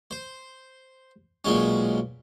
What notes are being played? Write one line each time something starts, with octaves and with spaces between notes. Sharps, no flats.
C5
B1 A#2 G#3 C#4